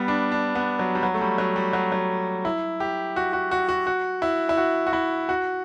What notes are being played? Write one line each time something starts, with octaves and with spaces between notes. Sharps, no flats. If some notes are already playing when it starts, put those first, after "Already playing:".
Already playing: G3 B3
D4
D4
B3
F#3
G3
F#3
A3
G3
F#3
G3
F#3
F#3
E4
G4
F#4
F#4
F#4
F#4
F#4
E4
E4
F#4
F#4
E4
F#4